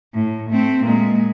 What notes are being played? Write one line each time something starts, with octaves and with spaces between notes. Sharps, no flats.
A2
A3 C4
A#2 G#3